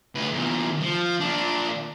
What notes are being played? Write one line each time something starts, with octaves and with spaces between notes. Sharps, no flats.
D2 B4
E2 A#2
F3
A#2 D4